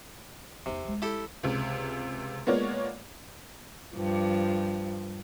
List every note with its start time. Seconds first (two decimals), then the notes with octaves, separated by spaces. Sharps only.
0.66 E2 C3 D#4
0.85 D2 G#3
1.02 E4 G4 A4
1.43 C#2 C3
2.47 G#3 A#3 B3 F4 C#5 D5
3.95 G2 F3